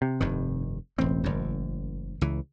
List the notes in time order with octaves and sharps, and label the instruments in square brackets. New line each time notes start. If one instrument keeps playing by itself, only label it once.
[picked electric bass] C3
[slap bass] F1 G2 D#3
[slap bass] E1 C4 [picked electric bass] A1
[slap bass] F#1 F#2
C#2 E3